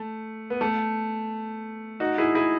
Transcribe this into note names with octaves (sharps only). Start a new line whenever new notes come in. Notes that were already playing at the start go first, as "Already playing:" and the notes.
Already playing: A3
B3
A3
D#4 F#4
E4 G#4
E4 G#4